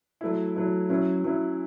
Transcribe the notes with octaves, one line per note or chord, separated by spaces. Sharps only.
F#3 A3 E4
F#3 A3 E4
F#3 C#4 E4
F#3 C#4 E4